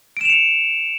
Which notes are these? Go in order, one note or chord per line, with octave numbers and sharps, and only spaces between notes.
C#7 D7 E7 F7